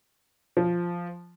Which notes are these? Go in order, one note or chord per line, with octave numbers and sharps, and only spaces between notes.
F3